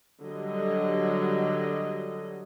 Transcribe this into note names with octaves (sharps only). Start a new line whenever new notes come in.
D3 F#3 G3 D#5